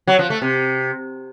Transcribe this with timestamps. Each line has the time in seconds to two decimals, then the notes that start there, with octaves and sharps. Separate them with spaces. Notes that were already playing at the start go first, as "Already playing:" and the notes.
0.07 F#3
0.19 F3
0.30 A3
0.42 C3